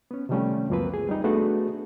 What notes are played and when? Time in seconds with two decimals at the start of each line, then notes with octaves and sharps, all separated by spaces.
0.11 B3 C#4
0.29 C3 D#3 F3 G3 A3 C#4
0.70 C#2 F#2 F3 A#3 C4 B4
0.94 G#4
1.09 G3 D#4
1.24 A3 B3 D4 F#4 G#4 A4